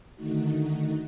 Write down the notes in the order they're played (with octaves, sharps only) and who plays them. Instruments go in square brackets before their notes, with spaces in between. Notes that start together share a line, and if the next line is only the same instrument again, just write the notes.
[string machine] D3 D#3 A3 D#4 F#4